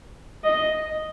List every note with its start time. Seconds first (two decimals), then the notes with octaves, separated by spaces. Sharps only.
0.44 D#5